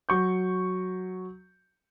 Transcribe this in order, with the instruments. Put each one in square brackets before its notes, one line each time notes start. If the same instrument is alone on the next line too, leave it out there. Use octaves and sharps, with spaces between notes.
[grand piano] F#3 C#6 G6